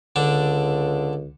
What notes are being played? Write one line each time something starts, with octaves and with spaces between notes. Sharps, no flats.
C#2 D3 D4